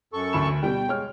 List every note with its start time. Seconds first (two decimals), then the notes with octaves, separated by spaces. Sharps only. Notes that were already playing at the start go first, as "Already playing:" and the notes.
0.13 F#2 A4 C#6
0.33 D2 B5 E7
0.63 B2 G3 G5
0.88 G#3 C#5 F6